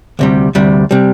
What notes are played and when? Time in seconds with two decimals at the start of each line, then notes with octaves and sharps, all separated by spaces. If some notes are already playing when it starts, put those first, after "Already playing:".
0.19 D2 C3 G3
0.55 D2 C3 G3
0.91 C3 G3